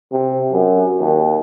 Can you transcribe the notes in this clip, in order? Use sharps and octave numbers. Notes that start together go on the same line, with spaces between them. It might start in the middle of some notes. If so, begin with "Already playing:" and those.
C3
F#2
D#2